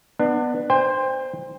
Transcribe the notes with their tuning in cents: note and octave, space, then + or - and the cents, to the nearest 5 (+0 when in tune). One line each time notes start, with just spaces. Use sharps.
B3 +0 D4 +30
C5 +0 G5 +35